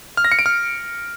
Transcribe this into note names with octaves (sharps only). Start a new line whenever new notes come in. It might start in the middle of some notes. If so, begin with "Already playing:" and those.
F6
A#6
C#7
D7
F6